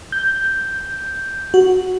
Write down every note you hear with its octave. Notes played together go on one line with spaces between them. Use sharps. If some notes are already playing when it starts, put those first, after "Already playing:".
G6
F#4